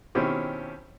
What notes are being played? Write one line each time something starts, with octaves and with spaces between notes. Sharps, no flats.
B2 D#3 C4 C#4 E4 G4